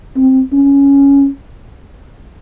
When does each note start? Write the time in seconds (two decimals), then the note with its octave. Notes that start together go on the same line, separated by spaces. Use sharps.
0.16 C4
0.53 C#4